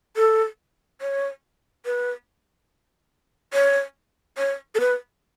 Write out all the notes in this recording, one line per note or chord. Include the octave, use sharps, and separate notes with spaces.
A4
C#5
B4
C#5
C#5
A4
B4